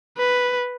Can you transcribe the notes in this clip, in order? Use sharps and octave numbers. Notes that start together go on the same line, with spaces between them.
B4